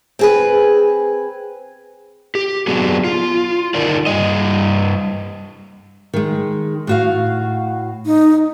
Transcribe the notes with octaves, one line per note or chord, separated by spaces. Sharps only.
C4 G#4 B4
G4
F#3 B3 D4 F#4 G#4
F4
D3 D#4 F4 A#4 D5
G2 G3 D#5
D#3 G#3
A2 F#4 F5
D#4